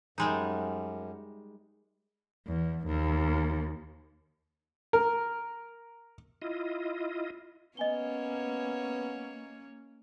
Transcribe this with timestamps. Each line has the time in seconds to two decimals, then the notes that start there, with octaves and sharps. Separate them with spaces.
0.18 F#2 G3 G#3 D#4
2.47 E2
2.87 D#2
4.93 A#4
6.42 E4 F4 D#5
7.77 A#3 B3 C#4 C#5 D#5 G#5 G7